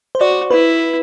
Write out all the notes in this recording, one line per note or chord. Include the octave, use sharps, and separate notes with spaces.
C5
F#4 D5
E4 B4